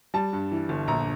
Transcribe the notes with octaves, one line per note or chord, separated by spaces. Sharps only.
G3 A5
G2
E3
G1
A#1 A#5